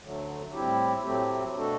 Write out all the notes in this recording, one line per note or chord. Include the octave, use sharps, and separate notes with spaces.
D2 D3 F#3 A3
A2 G3 C4 E4 G4
A2 F#3 A3 C4 G4
B2 A3 D4 F#4 A4